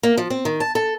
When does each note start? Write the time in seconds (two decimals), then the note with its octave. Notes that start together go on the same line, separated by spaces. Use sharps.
0.03 A#3
0.17 F3
0.30 C4
0.45 D#3
0.60 A5
0.75 A4